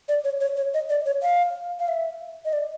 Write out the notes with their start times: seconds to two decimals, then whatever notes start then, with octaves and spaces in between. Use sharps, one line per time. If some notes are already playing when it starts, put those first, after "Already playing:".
0.09 D5
0.24 C#5
0.41 C#5
0.57 C#5
0.74 D#5
0.89 D5
1.06 C#5
1.22 F5
1.80 F5
1.88 E5
2.45 D#5
2.53 D5